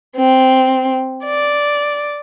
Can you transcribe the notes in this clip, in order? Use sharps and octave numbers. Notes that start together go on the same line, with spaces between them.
C4
D5